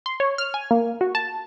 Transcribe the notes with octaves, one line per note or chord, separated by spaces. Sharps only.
C6
C#5
F6
G#5
A#3
F#4
A5